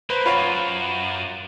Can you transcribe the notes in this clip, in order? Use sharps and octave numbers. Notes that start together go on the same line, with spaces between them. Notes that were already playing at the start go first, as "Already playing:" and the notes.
A#3 B4 C5
F#2 F4 C#5 F5 F#5 B5